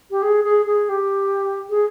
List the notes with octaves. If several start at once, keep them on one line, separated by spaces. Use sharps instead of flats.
G4
G#4
G#4
G#4
G4
G#4